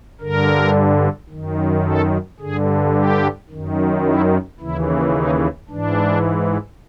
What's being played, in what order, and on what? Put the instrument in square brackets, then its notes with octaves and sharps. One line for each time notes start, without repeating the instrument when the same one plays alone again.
[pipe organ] G2 D3 A#4
F#2 D#3
A4
G2 D3 G#4
G4
F#2 D#3
E4
D#2 C#3 E3 E4
D#4
G#2 E3 D4